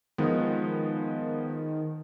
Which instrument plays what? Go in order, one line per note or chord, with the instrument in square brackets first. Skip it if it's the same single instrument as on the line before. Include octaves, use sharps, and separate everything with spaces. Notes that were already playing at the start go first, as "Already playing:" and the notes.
[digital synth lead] D#3 [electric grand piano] F3 G#3 B3